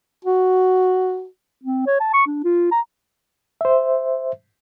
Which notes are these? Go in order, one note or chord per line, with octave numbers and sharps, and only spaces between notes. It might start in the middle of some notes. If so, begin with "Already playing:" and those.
F#4
C4
C#5
A5
C#6
D4
F4
A#5
C5 E5